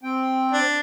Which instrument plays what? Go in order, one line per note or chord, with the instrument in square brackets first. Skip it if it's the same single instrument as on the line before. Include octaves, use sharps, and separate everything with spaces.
[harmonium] C4 G5
[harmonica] D4